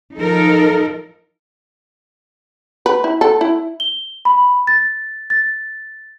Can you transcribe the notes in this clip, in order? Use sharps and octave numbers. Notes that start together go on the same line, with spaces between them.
F3 D#4 A4 A#4
B4
E4
A4
E4
G7
B5
A6
A6